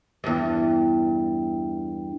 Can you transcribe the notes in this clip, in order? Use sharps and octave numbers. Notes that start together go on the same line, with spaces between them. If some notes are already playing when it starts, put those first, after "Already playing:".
E2 G2